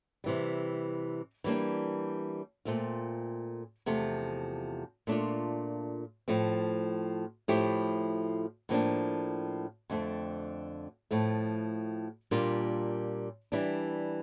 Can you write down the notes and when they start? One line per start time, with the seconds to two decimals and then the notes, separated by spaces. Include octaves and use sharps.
0.24 C3 E3 G3
1.44 E3 G3 A#3 D4
2.65 A#2 A3 C4 F4
3.86 E2 C3 F3 A3
5.07 A#2 A3 D4 F4
6.28 A2 F3 A3 C4
7.48 A2 F3 A3 E4 G4
8.69 A2 F3 A#3 D4
9.90 F2 D3 A3 C4
11.11 A2 F3 A3
12.31 A#2 G3 A#3 D4 F4
13.52 E3 G3 D4